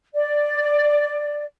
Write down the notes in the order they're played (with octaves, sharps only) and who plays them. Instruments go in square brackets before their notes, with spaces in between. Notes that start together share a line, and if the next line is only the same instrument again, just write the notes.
[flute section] D5